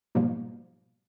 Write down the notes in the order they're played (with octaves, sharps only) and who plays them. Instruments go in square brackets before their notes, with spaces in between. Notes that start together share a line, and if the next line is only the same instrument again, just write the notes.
[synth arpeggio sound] G#2 B2 F3 G3 A#3